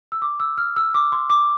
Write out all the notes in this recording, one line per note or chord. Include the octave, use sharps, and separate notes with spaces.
E6
D6
E6
F6
E6
D6
C6
D6